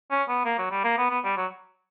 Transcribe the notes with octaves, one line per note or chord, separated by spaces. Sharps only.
C#4
B3
A#3
F#3
G3
A#3
B3
B3
G3
F#3